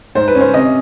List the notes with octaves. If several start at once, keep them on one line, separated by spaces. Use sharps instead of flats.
G#2 C5
B4
C#4
C5
C3 D#5